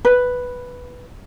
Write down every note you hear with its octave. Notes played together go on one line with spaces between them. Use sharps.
B4